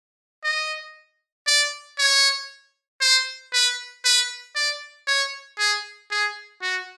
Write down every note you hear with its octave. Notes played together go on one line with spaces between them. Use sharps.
D#5
D5
C#5
C5
B4
B4
D5
C#5
G#4
G#4
F#4